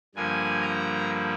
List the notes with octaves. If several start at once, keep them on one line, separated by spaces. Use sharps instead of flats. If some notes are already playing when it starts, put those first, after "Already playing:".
G2 D3 F3 A#3 G#5
A#5